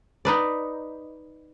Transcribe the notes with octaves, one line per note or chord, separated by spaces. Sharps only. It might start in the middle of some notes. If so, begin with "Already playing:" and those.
D#4 B4 D5